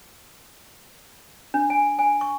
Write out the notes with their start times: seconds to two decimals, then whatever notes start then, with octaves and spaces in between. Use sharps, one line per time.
1.54 D4
1.70 G#5
1.99 G#5
2.21 C#6